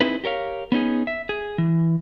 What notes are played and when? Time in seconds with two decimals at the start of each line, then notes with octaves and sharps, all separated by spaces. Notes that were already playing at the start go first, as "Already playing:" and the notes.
0.01 C4 D#4 E4 G#4 B4
0.24 G4 A#4 C#5 F5
0.72 B3 C#4 D#4 G#4
1.07 E5
1.29 G#4
1.58 E3